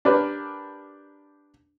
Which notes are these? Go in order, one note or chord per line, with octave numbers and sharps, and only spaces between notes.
D4 G4 A#4 B4